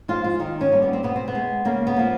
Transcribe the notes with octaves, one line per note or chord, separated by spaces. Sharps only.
F3 G#3 F4
F4
D#3 D#4
C#4
G3 A#3
B3
C4
B2 B3
C4
B3
G#3
C#3 A#3
B3
F3 A#3